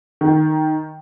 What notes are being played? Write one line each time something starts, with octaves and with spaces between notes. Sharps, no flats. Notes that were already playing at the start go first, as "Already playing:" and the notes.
D#3